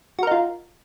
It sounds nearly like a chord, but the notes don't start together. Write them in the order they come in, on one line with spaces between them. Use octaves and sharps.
F#4 A#4 D#4 F4